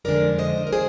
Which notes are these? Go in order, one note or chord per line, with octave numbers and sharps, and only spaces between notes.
F2 D3 G#3 D4 A#4 D5
C5 D#5
A#4
G#4 C5